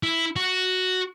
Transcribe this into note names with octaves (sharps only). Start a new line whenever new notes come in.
E4
F#4